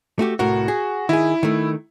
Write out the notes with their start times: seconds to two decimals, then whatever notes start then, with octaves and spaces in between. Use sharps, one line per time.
0.19 A3 F#4 G4
0.39 C2 A2 F#4 A#4
0.68 G#4
1.09 D#3 E4 G#4
1.43 D#3 A3